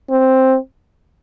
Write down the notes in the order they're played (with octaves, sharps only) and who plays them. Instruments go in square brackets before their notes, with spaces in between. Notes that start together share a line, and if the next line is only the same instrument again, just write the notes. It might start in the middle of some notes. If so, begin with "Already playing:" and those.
[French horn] C4